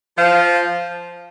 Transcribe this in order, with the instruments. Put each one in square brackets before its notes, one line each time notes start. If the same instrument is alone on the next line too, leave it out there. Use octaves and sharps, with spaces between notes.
[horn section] F3